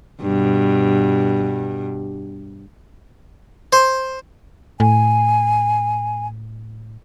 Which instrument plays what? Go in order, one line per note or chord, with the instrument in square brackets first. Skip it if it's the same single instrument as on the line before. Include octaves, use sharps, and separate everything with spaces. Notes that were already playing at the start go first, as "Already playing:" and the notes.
[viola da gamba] G2 B2
[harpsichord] C5
[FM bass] A2 [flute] G#5